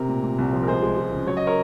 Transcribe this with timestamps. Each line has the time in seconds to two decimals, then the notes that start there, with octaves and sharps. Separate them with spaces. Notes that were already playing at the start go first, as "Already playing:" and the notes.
Already playing: C3 A#4
0.09 A#2
0.23 A#2
0.38 C2
0.53 F3
0.63 A#4
0.67 C#2 G#4 C5
0.82 G#3
0.97 G#3
1.12 C#3
1.26 F#3 C#5
1.37 D#5
1.47 A#4 C#5